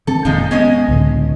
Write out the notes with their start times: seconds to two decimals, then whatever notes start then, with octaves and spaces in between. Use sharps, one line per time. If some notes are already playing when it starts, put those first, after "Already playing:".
0.07 D#3 C4 A4
0.25 F1 A#2 F3 G#3 C4 D#4
0.51 G#3 B3 C#4 D#5
0.88 C#2 A2 D3